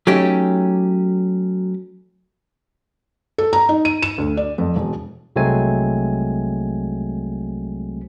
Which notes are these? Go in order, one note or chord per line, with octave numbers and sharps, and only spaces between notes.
F#3 A3 C#4 D#4 G4
A4
A#5
D#4
D#7
E7
D2
D5
F2
E1
C2 F#3 G#3 A3 C4 G#5